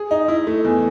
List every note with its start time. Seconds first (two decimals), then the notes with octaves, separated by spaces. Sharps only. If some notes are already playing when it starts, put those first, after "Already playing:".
Already playing: G#4
0.11 D#4
0.28 E4
0.47 A3
0.65 E2